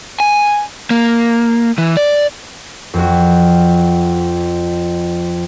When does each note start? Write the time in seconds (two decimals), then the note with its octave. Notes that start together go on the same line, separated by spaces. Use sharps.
0.20 G#5
0.90 A#3
1.78 E3
1.97 D5
2.94 F2 F#4